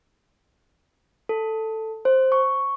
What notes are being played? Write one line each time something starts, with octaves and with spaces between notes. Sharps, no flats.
A4
C5
C#6